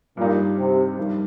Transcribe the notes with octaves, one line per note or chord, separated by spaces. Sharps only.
G2 A#2 G3 D#4
C3
G2 D#3 G3